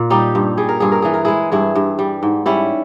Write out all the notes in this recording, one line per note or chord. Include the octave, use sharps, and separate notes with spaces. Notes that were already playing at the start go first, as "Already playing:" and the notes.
Already playing: A#2
G3 D#4 G4
G2
G3 G#4
A#4
G2 G#4
A#4
E3 G#4
A#4
G#3 E4 G#4
G2 E4 G#4
G2
G3
G#2
G3 C#4 E4